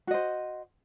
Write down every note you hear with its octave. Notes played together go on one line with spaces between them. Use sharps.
F#4 C5 D#5